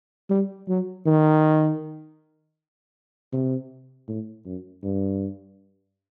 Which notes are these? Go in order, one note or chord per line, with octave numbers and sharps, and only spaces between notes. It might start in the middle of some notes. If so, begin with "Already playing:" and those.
G3
F#3
D#3
C3
A2
F#2
G2